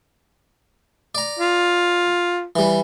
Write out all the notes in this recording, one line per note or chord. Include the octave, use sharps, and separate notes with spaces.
D5 A#5
F4
E3 G3